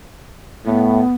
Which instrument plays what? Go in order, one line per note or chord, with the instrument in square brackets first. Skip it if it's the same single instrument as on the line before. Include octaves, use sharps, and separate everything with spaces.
[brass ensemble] A2 [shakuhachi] B3